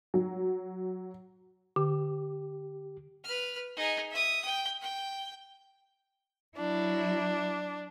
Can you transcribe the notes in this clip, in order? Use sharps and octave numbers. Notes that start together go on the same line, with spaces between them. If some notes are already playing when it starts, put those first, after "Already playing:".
F#3
D3 G4
B4 F6
D#4 G#4
E5 D#6
G5
G5
F#3 D4 E4